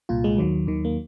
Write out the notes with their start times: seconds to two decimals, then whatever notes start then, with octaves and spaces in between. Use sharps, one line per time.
0.09 C2 A#2 F4
0.24 G#3
0.38 D#2 D#3 F#3
0.67 D#2 D#3
0.85 A#3